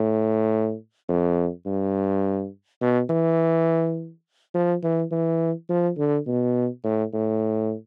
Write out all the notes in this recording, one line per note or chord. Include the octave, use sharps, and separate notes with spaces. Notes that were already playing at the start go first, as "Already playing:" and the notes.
Already playing: A2
F2
G2
B2
E3
F3
E3
E3
F3
D3
B2
A2
A2